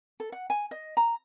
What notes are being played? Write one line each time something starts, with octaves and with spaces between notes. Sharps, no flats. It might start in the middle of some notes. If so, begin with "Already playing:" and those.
A4
F#5
G#5
D#5
A#5